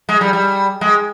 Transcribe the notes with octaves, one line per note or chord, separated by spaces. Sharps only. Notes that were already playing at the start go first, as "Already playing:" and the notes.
G#3
G3
G3
G#3